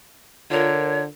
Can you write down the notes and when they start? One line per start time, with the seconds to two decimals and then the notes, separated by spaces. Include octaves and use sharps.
0.51 D3 F4 A#4 C#5